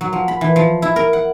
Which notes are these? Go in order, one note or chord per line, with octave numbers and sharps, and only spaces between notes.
F#3
F3
B5
E3
F3
E4
A#4
F#5